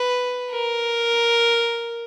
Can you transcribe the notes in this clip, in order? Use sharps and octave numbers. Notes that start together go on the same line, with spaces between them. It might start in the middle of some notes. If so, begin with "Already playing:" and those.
Already playing: B4
A#4